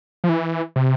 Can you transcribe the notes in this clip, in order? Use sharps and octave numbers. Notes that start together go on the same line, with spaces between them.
F3
E3
C3